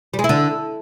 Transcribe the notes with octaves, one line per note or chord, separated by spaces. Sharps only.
G3
G#3
E4
D3